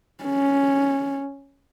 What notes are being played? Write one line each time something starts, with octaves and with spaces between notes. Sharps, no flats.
C#4